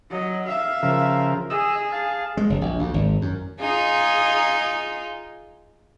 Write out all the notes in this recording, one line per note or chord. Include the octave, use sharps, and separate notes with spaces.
F#3 D#5
E5 F5
C#3 F3 A#4
G#4 D#5 E6
F5 A5
G#3
F#1
A#1
D2
G#1
F#2
D#4 F4 G#4